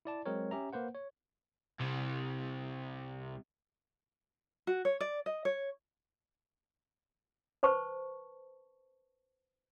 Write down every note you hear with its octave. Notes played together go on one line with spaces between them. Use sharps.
E4 D5 A5
F#3 G#3 C4 A#4 C#5
C#4 G4 E5 A#5
A#3 B4 C5 F#5
C#5
C2 C3
F#4
C#5
D5
D#5
C#5
B4 C5 A5 C#6